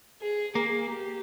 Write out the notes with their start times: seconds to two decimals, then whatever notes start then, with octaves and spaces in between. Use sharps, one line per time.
0.21 G#4
0.55 A#3 G#4
0.89 G4